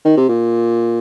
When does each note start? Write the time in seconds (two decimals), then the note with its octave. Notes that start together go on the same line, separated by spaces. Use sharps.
0.05 D#3
0.17 C3
0.29 A#2